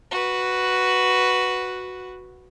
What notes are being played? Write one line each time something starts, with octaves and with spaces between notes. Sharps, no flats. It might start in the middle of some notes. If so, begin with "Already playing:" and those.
F#4 B4